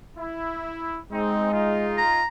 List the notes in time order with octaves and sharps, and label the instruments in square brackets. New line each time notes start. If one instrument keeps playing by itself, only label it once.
[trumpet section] E4
[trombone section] G#3 [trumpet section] C4 D#4
[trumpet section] D#4 F4
[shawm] A#5